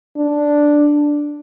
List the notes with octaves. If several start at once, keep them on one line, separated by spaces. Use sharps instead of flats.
D4